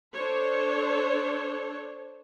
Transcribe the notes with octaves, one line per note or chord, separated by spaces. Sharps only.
D4 A4 C5 C#5